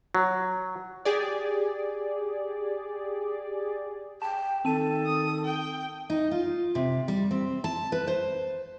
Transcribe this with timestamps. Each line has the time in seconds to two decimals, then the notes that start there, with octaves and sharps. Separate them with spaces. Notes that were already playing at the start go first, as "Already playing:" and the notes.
0.15 F#3
1.05 G4 G#4 D5
4.22 G5 A5
4.65 D#3 C4 A4 A5 D#7
5.06 D#6
5.45 G5
6.10 D#4
6.31 F4
6.75 C3
7.08 G3
7.31 C4
7.64 A5
7.92 B4
8.07 C5